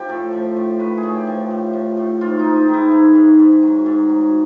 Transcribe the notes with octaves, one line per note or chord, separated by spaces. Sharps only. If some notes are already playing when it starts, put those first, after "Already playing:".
Already playing: F3 G4
A2 A4
F3
A2
A2 B4
G#4
A2
G4
F3
A2
F3
A2
G#2 F4
G#2 D#4
D#4
D#3
E4
G#2
G#2
G#2
F#3
G#2
F#3